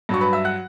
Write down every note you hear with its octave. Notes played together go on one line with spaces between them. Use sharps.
G2 F#3 C#6
B4 B5
E5 E6
F#5 F#6